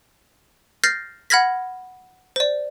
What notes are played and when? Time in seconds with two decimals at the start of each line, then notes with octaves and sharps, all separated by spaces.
0.84 F6 G6 A6 A#6 C7
1.30 F#5 B5 F6 G#6 A#6 B6
2.36 C5 D5